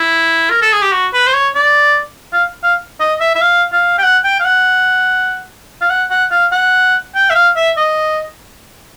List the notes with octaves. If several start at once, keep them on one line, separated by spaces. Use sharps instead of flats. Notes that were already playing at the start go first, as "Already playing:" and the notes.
Already playing: E4
A#4
A4
G#4
G4
F#4
B4
C5
C#5
D5
F5
F5
D#5
E5
E5
F5
F5
G5
F#5
G5
F5
F#5
F5
F#5
F#5
F5
F#5
G5
E5
F5
E5
D#5